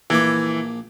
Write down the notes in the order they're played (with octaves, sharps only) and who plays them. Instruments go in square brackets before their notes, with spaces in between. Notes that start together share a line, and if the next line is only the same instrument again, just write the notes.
[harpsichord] A#1 A#3 D6 [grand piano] E3